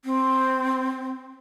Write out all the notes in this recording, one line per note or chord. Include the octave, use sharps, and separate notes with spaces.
C4